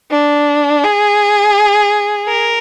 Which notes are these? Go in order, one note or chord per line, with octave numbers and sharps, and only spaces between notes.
D4
G#4
A#4